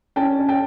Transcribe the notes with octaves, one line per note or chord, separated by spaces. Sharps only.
C#4 G5 A5
C#4
G5 A5